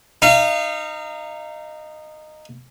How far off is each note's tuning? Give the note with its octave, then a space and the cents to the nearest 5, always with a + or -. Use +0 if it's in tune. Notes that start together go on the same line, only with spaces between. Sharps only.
D#4 -15 F5 -35